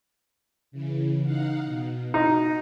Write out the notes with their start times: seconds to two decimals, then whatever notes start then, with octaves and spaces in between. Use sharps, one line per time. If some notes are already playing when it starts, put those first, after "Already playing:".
0.72 C#3 E3
1.22 D#4 F5 F#5
1.65 B2
2.14 D#4 F#4